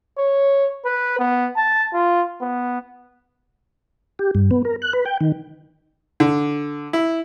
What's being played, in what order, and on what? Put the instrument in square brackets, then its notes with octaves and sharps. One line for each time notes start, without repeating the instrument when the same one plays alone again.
[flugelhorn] C#5
B4
B3
A5
F4
B3
[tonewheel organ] G4
G2
B3
A#4
F#6
B4
G5
D#3
[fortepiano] D3
E4